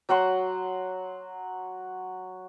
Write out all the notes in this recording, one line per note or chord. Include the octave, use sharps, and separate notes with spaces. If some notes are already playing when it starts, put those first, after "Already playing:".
F#3 F#4 F#5 C6